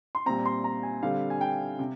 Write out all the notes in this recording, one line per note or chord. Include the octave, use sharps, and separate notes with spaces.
C6
A#2 G3 C4 A#5
C6
A#5
G#5
D3 G3 C4 F5
G#5
G5
C3